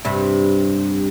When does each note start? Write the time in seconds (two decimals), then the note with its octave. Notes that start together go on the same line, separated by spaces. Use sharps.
0.05 G2 C3 G3